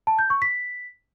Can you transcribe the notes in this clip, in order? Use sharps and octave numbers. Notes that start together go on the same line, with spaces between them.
A5
G6
C#6
B6